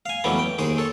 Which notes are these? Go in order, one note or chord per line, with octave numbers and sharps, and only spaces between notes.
F5 G#5
E3 F#3 G3 A3 B3 C#4
G5
D#2 D#3 G#4 C5
A4 C#5